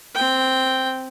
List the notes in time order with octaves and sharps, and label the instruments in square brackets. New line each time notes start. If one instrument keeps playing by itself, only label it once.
[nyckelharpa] C4 G5